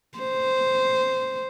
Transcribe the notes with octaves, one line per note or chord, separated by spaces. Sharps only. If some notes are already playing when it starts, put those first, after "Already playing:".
C5